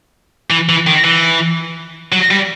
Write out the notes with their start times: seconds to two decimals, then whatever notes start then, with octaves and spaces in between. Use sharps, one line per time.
0.50 E3
0.69 E3
0.87 D#3
1.04 E3
2.12 F#3
2.31 G3